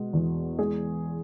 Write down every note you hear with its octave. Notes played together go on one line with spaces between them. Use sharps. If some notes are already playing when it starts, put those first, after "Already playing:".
Already playing: B2 G#3
E2
G#3 G#4